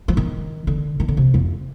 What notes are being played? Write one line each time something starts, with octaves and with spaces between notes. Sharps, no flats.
F3
D#3
D3
D#3
D3
C3
F2